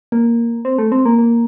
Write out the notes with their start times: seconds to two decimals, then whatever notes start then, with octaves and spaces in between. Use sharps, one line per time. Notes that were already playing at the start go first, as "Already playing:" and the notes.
0.12 A#3
0.65 C4
0.78 A3
0.92 C4
1.05 A#3
1.18 A#3